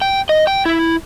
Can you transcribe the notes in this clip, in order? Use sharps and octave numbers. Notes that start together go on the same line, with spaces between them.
G5
D#5
G5
E4